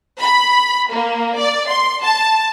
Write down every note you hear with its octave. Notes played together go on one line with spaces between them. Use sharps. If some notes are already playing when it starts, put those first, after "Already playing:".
B5
A#3
D5
C6
A5